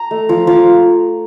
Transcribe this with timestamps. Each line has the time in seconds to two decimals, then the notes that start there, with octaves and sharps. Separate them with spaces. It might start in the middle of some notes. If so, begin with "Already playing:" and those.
Already playing: A#5
0.11 A3
0.29 F3
0.47 F3